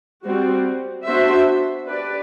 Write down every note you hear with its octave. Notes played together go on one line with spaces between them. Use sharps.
G3 C4 F#4
B3 D4 F#4 C5 E5
D4 G4 B4 D5